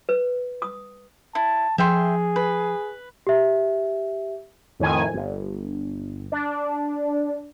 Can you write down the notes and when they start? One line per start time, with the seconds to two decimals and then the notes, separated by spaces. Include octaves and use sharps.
0.09 B4
0.62 D#6
1.35 E4 A5
1.78 F3 G#4 E5 G5 C6
2.36 B4
3.27 G4 E5
4.80 F2 A2 D#3 G#5
5.14 G1
6.32 D4